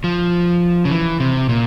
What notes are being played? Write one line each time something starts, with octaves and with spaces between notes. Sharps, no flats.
F3
C#3
E3
C3
A#2